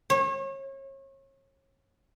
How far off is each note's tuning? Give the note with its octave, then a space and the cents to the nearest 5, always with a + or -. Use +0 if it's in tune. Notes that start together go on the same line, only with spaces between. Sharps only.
C#5 -35